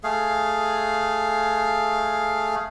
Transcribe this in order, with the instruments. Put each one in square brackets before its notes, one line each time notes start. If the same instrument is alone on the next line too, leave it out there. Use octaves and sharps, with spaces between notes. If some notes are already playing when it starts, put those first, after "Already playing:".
[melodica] A3 G#4 F5